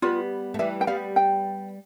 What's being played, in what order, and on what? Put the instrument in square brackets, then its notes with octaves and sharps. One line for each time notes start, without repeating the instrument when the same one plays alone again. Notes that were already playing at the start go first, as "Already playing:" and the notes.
[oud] G3 B3 [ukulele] F4
[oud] A3
[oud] E3 G3 [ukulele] E5
[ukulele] G5
[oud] G3 B3 [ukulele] F5
[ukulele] G5